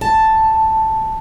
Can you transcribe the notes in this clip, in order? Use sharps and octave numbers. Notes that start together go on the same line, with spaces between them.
A5